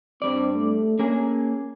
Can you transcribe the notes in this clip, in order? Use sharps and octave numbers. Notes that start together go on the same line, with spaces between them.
G2 G3 C4 D5
A3
A#3 C#4 G#4